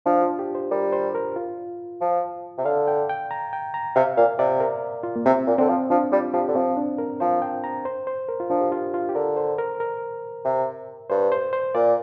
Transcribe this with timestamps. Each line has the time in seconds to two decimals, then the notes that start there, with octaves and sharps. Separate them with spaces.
0.06 F3 D4
0.22 F4
0.39 G4
0.55 C5
0.71 G3 A#4
0.93 C5
1.15 A#4
1.36 F4
2.01 F3
2.58 C3
2.65 D3 F5
2.88 G5
3.09 G5
3.31 A#5
3.53 G5
3.74 A#5
3.96 C3 F5
4.17 A#2 F5
4.39 C3 D5
4.60 A#4
5.03 F4
5.16 A#3
5.26 C3 C4
5.47 A#2
5.58 D3 C4
5.69 F3
5.90 F3 D4
6.12 G3 F4
6.34 F3 G4
6.48 D3
6.55 F3 C4
6.77 D4
6.98 A#4
7.20 F3 C5
7.42 G5
7.64 A#5
7.85 C5
8.07 C5
8.29 A#4
8.40 F4
8.50 F3 D4
8.61 G4
8.72 F4
8.94 F4
9.09 G4
9.15 D3 A#4
9.37 C5
9.59 A#4
9.80 A#4
10.45 C3
11.10 G2 C5
11.32 C5
11.53 C5
11.75 A#2 D5